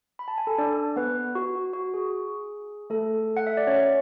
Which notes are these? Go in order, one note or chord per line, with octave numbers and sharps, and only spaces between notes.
B5
A5
G#5
A4 A5
D4 D5
B3 B4
F#4
F#4
F#4
G#4
A3 A4
F#5
E5
D5
C#4 C#5